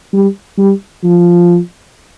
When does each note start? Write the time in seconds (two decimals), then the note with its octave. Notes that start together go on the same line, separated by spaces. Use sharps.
0.13 G3
0.58 G3
1.04 F3